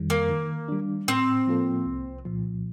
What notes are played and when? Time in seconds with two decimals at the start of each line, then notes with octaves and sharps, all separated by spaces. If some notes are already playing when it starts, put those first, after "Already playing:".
Already playing: F2 D#3 G3
0.10 A#3
0.30 D#3
0.68 G3 D4
1.08 A2 C4
1.47 F3 A#3 F4 A4
1.86 C2
2.25 A#2 F3